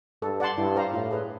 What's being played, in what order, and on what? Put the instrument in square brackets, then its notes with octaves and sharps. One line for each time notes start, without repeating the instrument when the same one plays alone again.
[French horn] G2 [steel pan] A4
[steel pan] D5 F#5 A5 C6
[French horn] G2 [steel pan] E4
[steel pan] G4 C5 F5 A#5
[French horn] A2 [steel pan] F4
[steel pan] G#4 B4